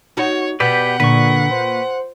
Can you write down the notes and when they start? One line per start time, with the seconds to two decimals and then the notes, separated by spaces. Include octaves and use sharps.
0.17 D#4 F#4 C#5
0.60 B2 B3 G4 B4 D5 F#5 G6
1.00 A#2 D3 B4 C#6
1.51 C5